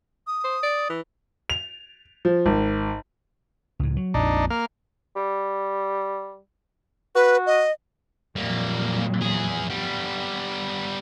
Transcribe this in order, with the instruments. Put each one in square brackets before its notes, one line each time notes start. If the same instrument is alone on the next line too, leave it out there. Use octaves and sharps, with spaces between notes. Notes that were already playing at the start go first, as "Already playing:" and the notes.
[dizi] D#6
[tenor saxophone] C5
D5
E3
[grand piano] F7
F3
G#1
[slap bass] C#2 A2
F#3
[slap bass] A#1 F2 F3 [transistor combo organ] D4 D#4
[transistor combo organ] A#3 F6
[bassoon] G3
[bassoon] F#4 [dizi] B4
[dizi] D#5
[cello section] F2 A#2 F#3 [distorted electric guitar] G3 A#3
[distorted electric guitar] E3 G#4
G3 B3